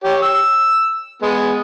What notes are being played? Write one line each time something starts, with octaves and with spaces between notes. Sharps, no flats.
G4 C#5
E6
G#3 B3